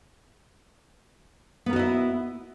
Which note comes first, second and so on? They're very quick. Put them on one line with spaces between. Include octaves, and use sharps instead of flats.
B3 A#4 F#4 D#5 E4